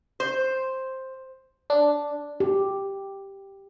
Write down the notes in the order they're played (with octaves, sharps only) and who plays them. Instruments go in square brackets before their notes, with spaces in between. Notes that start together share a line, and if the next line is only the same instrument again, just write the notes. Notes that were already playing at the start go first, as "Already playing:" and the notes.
[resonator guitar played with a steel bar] C5
[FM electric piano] D4
[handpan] G4